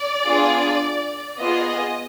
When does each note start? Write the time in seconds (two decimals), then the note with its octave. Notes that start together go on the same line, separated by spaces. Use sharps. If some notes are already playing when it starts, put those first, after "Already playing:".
Already playing: D5
0.25 B3 D4 F4 G#4
1.38 B3 F4 G#4 D#5
1.67 D#5